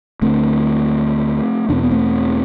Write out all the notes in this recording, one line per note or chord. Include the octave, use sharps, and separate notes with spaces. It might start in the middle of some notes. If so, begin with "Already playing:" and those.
D2 D3 A3 C4
E2 B2 D4
C4
B3
A3 C4